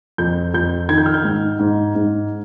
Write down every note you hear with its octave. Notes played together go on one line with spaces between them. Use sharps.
F2 G6
F2 G6
D#3 G#6
G6
F6
G6
G#2
G#2
G#2